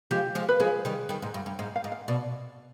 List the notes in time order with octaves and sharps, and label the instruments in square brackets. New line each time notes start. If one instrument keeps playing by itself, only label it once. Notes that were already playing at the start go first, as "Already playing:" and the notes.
[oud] F3 G#3 [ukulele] G4
[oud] F3 G#3
[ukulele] B4
[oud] F3 G#3 [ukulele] G#4
[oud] D#3 G3
D#3 G3
G#2
G2
G2
[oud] G#2 [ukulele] F5
[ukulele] F5
[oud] G#2
[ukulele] F5
[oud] B2 [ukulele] D5